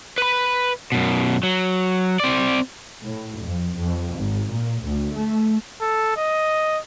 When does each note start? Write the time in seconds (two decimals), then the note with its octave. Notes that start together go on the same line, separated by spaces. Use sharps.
0.18 B4 B5
0.92 F#2 B2
1.43 F#3
2.20 C4 D5
3.02 A2
3.41 F2
3.77 F2
4.16 G#1
4.48 A#2
4.83 D2
5.13 A3
5.81 A4
6.17 D#5